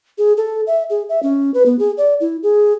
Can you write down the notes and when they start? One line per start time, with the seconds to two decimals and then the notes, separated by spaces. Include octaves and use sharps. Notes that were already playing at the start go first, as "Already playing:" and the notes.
0.18 G#4
0.37 A4
0.67 E5
0.90 G#4
1.09 E5
1.23 C#4
1.54 B4
1.66 B3
1.79 G#4
1.98 D5
2.21 E4
2.43 G#4